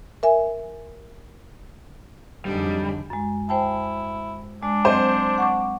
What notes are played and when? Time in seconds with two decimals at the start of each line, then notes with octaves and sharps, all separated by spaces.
0.23 A#4 E5 G#5
2.45 F2 G#2 D3 F#3 G3 D4
3.10 F#2 G#3
3.49 E4 C5 G5 A5
4.63 G#3 D4
4.85 F#3 C4 C5 D#5
5.38 F#5 C#6 D6